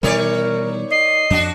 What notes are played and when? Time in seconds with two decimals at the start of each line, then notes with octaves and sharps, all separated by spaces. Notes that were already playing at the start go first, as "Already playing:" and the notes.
0.03 B2 D#3 E3 G3 A#4 C#5 D5
0.91 D#5 C7
1.30 F2 D4 F#4